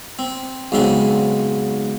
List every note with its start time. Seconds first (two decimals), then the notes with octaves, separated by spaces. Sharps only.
0.19 C4
0.72 B1 G#2 C#3 C4 C6